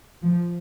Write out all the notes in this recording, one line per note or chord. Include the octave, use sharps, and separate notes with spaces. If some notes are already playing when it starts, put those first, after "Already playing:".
F3